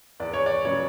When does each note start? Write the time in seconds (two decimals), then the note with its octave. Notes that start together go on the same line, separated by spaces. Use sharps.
0.20 E2 D5
0.34 C#5
0.46 D5
0.65 C#3 F#3 B3 C#5